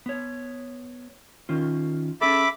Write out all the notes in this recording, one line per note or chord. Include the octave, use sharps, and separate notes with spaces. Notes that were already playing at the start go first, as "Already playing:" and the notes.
B3 C#5
D#3 C#4 F4
C#4 G#4 A4 E5 B5 D6